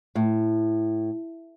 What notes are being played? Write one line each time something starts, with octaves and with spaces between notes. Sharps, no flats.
A2